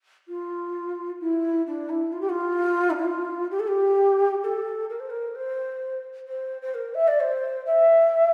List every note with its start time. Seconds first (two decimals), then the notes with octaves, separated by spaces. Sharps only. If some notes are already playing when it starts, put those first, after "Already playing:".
0.28 F4
1.20 E4
1.66 D4
1.89 E4
2.12 F4
2.21 G4
2.29 F4
2.90 D4
2.97 E4
3.05 F4
3.51 G4
3.59 A4
3.67 G4
4.43 A4
4.89 A#4
4.99 C5
5.10 A#4
5.35 C5
6.27 C5
6.61 C5
6.74 A#4
6.94 E5
7.07 D5
7.20 C5
7.66 E5